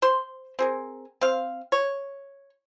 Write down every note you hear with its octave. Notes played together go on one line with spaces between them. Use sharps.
C5 C6
C4 G#4 A#4
C4 F5
C#5